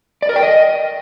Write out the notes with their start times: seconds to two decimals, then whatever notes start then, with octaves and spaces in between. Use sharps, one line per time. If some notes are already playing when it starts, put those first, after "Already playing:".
0.22 D5
0.29 A#4
0.36 G5
0.43 D#5